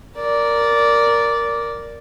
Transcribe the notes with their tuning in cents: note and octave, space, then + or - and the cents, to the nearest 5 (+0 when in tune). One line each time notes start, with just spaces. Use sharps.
A#4 +0 D5 -10